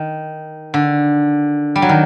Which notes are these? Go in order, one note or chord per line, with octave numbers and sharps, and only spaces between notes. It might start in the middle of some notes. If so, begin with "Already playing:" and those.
Already playing: D#3
D3
G3
F#3
D#3